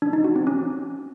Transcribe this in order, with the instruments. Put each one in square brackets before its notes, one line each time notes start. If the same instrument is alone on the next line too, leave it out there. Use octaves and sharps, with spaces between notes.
[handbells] D4
D#4
F#4
C4
C#4